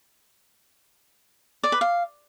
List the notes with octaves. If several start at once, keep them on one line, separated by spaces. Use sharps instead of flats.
D5
B4
F5